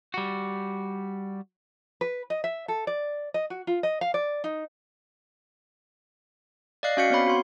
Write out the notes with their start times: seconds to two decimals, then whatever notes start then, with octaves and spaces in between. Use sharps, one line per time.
0.14 G3 F#4
2.01 B4
2.30 D#5
2.44 E5
2.68 A4
2.87 D5
3.34 D#5
3.50 F#4
3.67 F4
3.83 D#5
4.01 F5
4.14 D5
4.44 D#4
6.83 D5 D#5 F5 F#6 C7
6.97 C#4 F#4 F5 G6 B6 C#7
7.10 B3 C4 C#5 B5
7.26 F#4 C6